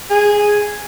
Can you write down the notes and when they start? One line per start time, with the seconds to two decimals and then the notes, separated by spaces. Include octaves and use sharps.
0.10 G#4